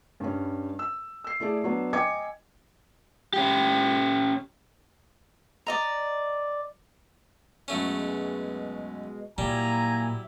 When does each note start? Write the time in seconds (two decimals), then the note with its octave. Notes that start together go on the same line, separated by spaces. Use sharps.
0.20 G2 G3 C#4
0.79 E6
1.24 E6 C7
1.40 A3 E4 G#4 D5
1.64 F#3 B3 D4
1.93 D#5 G5 G#5 D6 G#6 C#7
3.33 C#4 G4
5.67 D5 D#5 A#5
7.68 F#2 B2 G#3 A3 C#4
9.38 A#2 F#3 G3 A#3 E4 G#5 A#5